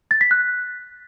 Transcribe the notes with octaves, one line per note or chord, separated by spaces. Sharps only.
A6
B6
F#6